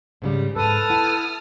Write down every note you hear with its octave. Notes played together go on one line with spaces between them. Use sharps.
G#2 C#3 G3
F2 G#2 A4 B4 A5 D#6 F6
E4 F#5